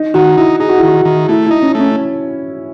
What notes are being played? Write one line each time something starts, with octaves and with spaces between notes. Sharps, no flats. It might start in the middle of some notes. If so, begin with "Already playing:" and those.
Already playing: D#4
D#3 F#4
D#4 E4
D#4 G#4
F#4
E4
D#3
F#4
D#3
A3 E4
D#4 E4
C#4
A3
C#4